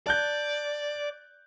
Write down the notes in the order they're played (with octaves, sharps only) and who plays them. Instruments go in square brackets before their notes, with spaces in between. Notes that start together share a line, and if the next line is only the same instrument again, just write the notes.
[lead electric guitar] D5 [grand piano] A5 F#6 G6